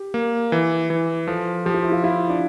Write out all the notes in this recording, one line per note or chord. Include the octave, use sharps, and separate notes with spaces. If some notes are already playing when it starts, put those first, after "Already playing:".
Already playing: G4
A#3
E3
E3
F3 A4
F3 G4
F4
E4
F4
E4 F4
D4